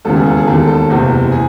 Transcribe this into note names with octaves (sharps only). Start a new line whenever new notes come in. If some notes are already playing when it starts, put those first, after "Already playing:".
E1 D#2 C#3 E3 A4
G#4
A4
G#4
E1 D#2 D#3 A4
A4
F#1 E2 C3 E3
G#4